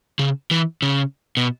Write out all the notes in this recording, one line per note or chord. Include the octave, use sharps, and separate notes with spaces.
C#3
E3
C#3
B2